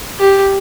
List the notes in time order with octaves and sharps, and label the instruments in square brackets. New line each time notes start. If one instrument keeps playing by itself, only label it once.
[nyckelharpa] G4